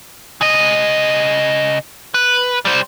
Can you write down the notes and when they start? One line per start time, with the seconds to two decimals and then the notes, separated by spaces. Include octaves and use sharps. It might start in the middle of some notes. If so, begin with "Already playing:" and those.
0.41 C#3 D#5
2.14 B4
2.65 G3 C5